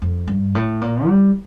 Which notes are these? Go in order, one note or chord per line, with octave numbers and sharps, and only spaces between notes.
F2
G2
A2
A#2
G3